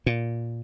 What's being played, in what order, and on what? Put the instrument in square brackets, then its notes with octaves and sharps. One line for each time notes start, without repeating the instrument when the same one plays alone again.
[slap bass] A#2